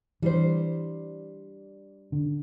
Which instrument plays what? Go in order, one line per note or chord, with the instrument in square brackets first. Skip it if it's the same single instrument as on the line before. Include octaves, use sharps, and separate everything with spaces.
[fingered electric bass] E3 [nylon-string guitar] G3 D4 C5
[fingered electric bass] D3